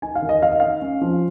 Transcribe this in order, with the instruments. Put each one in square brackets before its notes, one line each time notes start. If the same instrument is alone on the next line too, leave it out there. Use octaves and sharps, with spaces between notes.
[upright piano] D#4 G#5
F5
D#3
D#5
D#3 F5
D#5
D#4 F5
C#4
F3